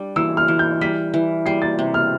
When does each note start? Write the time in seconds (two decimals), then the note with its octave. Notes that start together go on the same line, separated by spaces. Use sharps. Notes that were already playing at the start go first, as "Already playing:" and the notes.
Already playing: G3 D4
0.16 E3 E6
0.37 F6
0.48 E3
0.59 G6
0.81 G3 B6
1.14 E3
1.46 G3 C7
1.62 A6
1.79 C3
1.94 F6